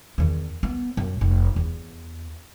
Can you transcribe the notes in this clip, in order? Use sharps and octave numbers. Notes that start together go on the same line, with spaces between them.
E2 D#3
B3
F#2
F1 D#4
E2